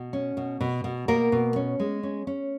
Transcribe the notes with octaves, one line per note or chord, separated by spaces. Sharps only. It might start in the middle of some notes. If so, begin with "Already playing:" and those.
Already playing: B2
C#4
B2
B2
B2
B2 A#3 A#4
B2
C#4
G#3
C#4
C#4